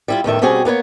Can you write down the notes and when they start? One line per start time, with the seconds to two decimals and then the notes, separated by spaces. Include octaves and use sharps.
0.08 G3 E4 F4
0.24 E2 A2 D#3 E5
0.41 B2 G3 C4 C#4 F#4 G#4
0.65 A#3 B3 B4 C#5